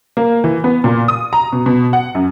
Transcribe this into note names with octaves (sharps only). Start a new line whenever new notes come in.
A#3
E3
B3
A#2
D#6
A#5
B2
B2
F#5
F#2